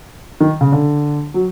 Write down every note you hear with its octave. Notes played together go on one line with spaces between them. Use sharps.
D#3
C#3
D3
F#3